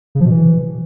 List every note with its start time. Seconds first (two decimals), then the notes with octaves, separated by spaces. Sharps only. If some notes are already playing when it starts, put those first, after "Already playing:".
0.15 C#3
0.20 F3
0.25 B2
0.31 E3